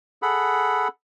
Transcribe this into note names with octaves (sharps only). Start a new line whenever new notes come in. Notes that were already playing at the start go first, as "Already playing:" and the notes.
G#4 A4 F#5 B5